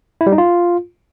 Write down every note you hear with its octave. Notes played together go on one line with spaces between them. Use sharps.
E4
G3
D#4
F4